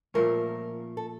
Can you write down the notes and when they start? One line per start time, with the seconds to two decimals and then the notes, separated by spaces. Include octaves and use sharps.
0.14 A#2 F3 A3 C#4 A#4
0.97 A4